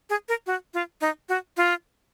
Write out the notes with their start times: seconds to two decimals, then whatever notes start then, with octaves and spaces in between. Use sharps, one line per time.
0.10 G#4
0.29 A#4
0.46 F#4
0.74 F4
1.01 D#4
1.29 F#4
1.57 F4